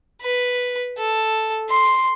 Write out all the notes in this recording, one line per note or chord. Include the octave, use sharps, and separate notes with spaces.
B4
A4
C6